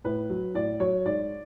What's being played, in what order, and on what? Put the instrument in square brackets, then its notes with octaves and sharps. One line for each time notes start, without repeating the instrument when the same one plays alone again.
[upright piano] A2 B4
F#3
A2 D5
F#3 C#5
G#2 D5